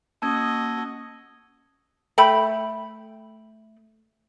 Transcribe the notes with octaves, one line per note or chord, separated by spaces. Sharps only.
A#3 C#4 F#4 D#5 A5 E6 G#6
A3 G5 B5